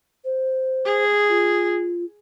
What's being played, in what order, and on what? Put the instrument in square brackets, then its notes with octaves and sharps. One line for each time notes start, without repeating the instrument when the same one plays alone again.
[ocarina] C5
[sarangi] G#4
[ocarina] F4